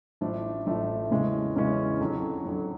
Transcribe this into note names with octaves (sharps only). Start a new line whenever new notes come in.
A1 A2 F3 A3 D4
A1 A2 F3 A3 D4
E2 C#3 E3 G#3 C#4
E2 C#3 E3 G#3 C#4
F2 D3 F#3
F2 D3 F#3